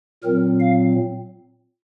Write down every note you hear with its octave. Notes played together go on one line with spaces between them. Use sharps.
A#2 F#3 C4 A#4
F5